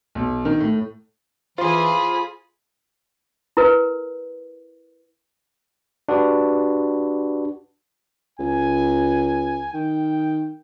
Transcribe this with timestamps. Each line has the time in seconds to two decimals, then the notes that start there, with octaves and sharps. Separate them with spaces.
0.15 B1
0.45 D#3
0.60 A2
1.58 E3 F4 G#4 C5 B5 C6
3.57 E4 A#4 B4
6.08 D4 F#4 G4 B4
8.39 C#2 G#5
9.74 D#3 G5